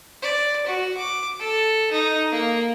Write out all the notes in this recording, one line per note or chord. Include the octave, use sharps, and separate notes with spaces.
D5
F#4
D6
A4
D#4
A#3